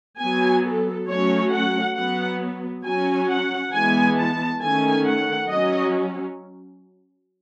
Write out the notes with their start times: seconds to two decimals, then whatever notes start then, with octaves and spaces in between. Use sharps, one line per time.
0.19 F#3 B3 G#5
0.63 A4
1.07 F#3 A3 C#4 C#5
1.52 F#5
1.95 F#3 B3 F#5
2.84 F#3 C#4 G#5
3.29 F#5
3.72 E3 G#3 B3 G#5
4.17 A5
4.61 D#3 A3 C#4 G#5
5.04 F#5
5.49 F#3 C#4 D#5